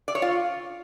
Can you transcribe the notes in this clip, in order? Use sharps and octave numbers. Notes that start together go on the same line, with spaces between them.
D5
C#5
F4